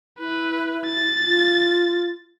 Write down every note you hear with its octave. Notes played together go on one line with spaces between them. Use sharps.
E4 B4
A6
F4